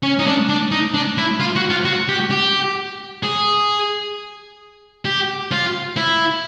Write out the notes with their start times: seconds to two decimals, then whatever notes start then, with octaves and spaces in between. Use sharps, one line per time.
0.03 C#4
0.19 D#4
0.26 D4
0.49 D4
0.71 D#4
0.94 D4
1.18 E4
1.40 F4
1.56 F#4
1.70 F4
1.85 F#4
2.09 G4
2.31 G4
3.23 G#4
5.05 G4
5.51 F4
5.97 E4